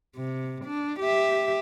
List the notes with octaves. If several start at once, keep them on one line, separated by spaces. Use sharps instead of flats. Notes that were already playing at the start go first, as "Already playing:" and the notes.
C3
D4
G4 E5